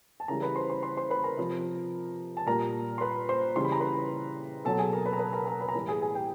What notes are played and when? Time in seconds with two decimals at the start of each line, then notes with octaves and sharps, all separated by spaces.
0.20 A5
0.28 C#3 E3 G3 A#4 A#5
0.42 B4 B5
0.56 C5 C6
0.70 C5 C6
0.83 C5 C6
0.97 C5 C6
1.10 B4 B5
1.24 A#4 A#5
1.37 C3 F3
2.37 A5
2.46 A#2 G3 A#4 A#5
2.98 C6
3.01 B4 B5
3.29 C5 C6
3.55 C#3 E3 G3 C6
3.65 B5
3.72 A#5
3.80 B4 B5
4.65 B2 F#3 A4 A5
4.78 G#4 G#5
4.93 A#4 A#5
5.06 B4 B5
5.13 A#5
5.19 B4 B5
5.33 A#4 A#5
5.47 A#4 A#5
5.61 B4 B5
5.69 A#5
5.74 A2 E3 G3 B4 B5
5.88 G#4 G#5
6.02 G#4 G#5
6.15 G4 G5